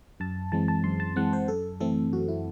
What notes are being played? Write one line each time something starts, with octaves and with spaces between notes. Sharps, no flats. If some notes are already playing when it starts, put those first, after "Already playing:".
F#2 A5
E3 G#3 C4 A5
A5
F#2 C6
A5
E3 G#3 C4 F#5
C5
F#2 A4
E3 A3 C4 A4
F#2 F#4
E4